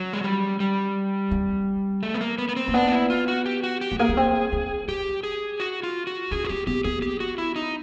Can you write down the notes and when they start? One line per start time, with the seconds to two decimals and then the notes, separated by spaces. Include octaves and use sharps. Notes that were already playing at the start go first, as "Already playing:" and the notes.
Already playing: F#3 C#4
0.13 G#3
0.24 G3
0.60 G3
1.31 C4
2.03 A3
2.14 B3
2.21 A#3
2.38 B3
2.49 B3
2.56 C4
2.68 A#3
2.74 B3 D4
2.87 D#4
2.92 E4
3.10 F4
3.28 F#4
3.46 G4
3.63 F#4
3.81 G4
3.92 A3
3.99 A#3 G#4
4.09 B3
4.17 C4
4.52 D4
4.88 D4 G4
5.23 G#4
5.60 F#4
5.83 F4
6.07 F#4
6.31 C#4 G#4
6.44 F#4
6.49 C4 G4
6.67 B3 G4
6.84 B3 G#4
7.02 G4
7.20 F#4
7.38 E4
7.56 D#4